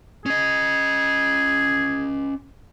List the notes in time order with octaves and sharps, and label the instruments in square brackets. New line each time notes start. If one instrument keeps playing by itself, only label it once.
[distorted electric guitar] C#4 D#5 [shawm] G#4